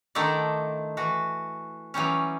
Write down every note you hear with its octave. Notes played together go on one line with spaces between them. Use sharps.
D3 D#3 A3 D#4 E4 D5
E3 F#4
E3 F#3 G3 C#4